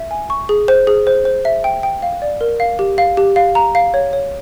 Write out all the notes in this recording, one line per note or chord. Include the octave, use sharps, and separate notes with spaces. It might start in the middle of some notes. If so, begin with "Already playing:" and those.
Already playing: E5
G#5
C#6
G#4
C5
G#4
C5
C5
E5
G5
G5
F5
D5
A#4
F5
G4
F5
G4
F5
A#5
F5
C#5
C#5